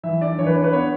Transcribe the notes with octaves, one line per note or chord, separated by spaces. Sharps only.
E3 E5
D4 D5
E3 C#5
B4
D4 C#5
B4
B3 C#5